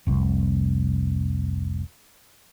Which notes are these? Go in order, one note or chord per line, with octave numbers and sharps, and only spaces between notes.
F1 C2